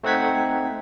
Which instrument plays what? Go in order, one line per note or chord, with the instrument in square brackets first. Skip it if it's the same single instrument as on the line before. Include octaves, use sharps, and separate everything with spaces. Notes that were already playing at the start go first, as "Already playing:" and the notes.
[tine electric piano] A3 C4 D#4 F#5 G#6 B6